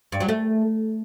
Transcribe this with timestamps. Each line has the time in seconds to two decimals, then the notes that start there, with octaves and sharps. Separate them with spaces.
0.12 G2
0.20 F#3
0.29 A3